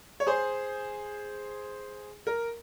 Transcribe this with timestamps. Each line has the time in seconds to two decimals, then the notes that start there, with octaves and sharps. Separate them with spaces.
0.20 C#5
0.27 G#4 C5
2.27 A#4